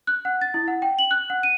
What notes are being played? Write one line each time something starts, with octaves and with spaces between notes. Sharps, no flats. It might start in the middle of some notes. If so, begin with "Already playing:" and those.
F#6
F#5
A6
E4
F#5
G5
F#7
F#6
F#5
D#7